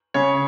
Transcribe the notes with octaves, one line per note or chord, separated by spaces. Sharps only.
C#3 C#5